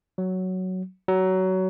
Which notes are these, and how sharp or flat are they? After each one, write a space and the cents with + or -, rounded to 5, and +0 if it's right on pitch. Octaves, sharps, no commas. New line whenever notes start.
F#3 +5
F#3 +20